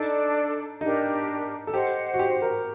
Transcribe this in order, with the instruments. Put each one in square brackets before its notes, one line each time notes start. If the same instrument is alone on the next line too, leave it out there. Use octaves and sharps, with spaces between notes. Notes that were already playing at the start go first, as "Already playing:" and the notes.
Already playing: [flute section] D4 A4 D5 [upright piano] D#4
[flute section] D4 G4 A#4 [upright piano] D#4
[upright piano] A4
[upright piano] G4 [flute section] C5 D#5 F#5
[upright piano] F#4
G4
A#4